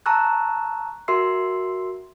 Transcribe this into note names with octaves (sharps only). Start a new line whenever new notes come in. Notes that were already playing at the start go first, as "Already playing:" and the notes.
A5 A#5 C#6 E6 F#6
F#4 A#4 E5 C6 E6 C7